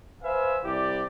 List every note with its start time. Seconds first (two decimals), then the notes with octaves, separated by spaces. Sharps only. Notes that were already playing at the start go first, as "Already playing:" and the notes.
0.23 B4 C5 E5 F5 G#5
0.64 C2 E4 G4 D5